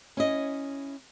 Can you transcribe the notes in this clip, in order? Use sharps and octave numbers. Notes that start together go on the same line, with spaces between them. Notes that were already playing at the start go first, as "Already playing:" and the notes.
C#4 E4 D#5